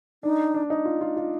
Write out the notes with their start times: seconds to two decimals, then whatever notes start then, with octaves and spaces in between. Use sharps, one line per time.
0.23 D4 D#4
0.54 D4
0.70 D#4
0.85 F4
1.01 F4
1.17 F4